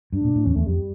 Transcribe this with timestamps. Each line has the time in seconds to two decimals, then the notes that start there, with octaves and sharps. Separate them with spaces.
0.12 G2 D4
0.24 A#2
0.35 A2
0.45 E2 C#4
0.55 E2 A3
0.66 F2 G3